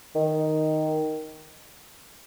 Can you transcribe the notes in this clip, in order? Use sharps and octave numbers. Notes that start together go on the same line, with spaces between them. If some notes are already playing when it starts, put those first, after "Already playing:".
D#3